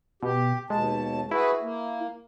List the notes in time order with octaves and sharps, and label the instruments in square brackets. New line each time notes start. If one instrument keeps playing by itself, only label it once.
[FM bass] B2 [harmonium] G4
[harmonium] D#2 B2 A5 [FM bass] G#3
[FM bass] E4 [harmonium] F#4 G#4 B4
[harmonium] A#3